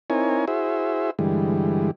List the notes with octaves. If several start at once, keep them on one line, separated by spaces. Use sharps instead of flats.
C4 D#4 E4 A#4 C#5 G#5
E4 F#4 G#4 C5 E5
G2 D3 E3 G3 G#3